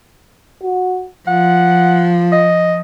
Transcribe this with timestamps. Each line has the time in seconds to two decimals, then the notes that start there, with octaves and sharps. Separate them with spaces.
0.63 F#4
1.28 F3 F4 F#5
2.32 D#5